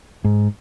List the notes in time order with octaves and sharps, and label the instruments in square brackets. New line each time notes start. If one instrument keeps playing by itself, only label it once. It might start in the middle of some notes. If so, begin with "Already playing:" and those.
[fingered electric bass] G#2